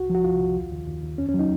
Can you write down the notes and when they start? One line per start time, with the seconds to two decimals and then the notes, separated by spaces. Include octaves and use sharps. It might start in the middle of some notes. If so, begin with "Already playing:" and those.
Already playing: C2 F#4
0.10 F3
0.15 F#4
0.24 C2 F4
0.40 C2
0.56 D#2
0.71 D#2
0.87 D#2
1.03 D#2
1.18 F2 C#4
1.29 C#4
1.34 F#3
1.39 D#4